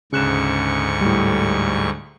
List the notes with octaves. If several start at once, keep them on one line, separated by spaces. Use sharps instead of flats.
D2 G#2 C#3 C#6 F#6 E7
A2 G3